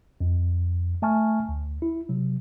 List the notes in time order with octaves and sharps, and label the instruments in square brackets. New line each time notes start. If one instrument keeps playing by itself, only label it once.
[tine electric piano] F2
A3 E5 G#5 A5 C#6 F6
D2
E4
C3 F#3